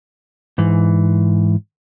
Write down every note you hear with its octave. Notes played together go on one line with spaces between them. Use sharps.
G#2 E3